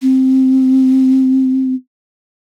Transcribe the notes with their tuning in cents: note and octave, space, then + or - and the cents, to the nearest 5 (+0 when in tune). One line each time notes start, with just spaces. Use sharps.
C4 +5